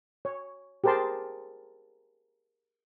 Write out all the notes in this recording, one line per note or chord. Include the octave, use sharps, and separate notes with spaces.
C#5
G4 G#4 A#4 C5 A5 C6